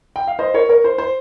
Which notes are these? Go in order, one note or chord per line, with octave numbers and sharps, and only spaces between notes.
G5
F5
C5 D#5
A#4 C#5
A#4 C#5
C5
C5